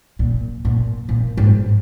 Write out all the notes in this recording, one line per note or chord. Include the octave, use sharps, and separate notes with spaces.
A#2
A#2
A#2
G#2